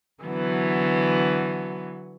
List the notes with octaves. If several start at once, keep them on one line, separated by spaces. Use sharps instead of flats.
D3 E3 F#3 B3